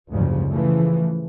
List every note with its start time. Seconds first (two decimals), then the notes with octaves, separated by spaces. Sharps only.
0.12 F#1 D2 G#2 C#3 F3 G3
0.49 C#3 E3 F3 A3